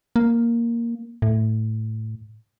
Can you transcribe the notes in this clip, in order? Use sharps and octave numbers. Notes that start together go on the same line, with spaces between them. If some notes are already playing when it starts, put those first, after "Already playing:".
A#3
A2